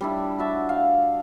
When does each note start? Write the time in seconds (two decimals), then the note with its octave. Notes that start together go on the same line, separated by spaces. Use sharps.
0.01 G3 D4 E4
0.39 F#4 E5 A5
0.69 F5